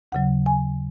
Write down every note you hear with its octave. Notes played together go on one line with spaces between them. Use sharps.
D#2 C#3 F#3 F#5
G#5